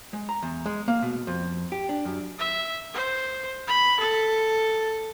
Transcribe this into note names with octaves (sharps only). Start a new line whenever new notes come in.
G#3
A#5
E2
G#3
A#3
B2
F2
G4
D4
F#2
E5
C5
B5
A4